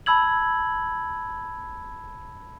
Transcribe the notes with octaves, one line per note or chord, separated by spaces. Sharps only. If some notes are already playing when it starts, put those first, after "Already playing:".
A5 B5 E6 G#6 F#7